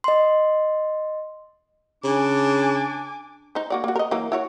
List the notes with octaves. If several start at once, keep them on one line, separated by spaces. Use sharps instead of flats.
D#5 C6
C#3 D4 G#5 D6
D#4 C5
A#3 F#4 D5
A#3 F#4
A#4 D#5
E3 F#3 A#3
E4 F#4 C#5